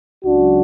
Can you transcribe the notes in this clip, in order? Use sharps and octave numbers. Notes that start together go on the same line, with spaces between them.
C#2 C#3 F#3 D4 F#4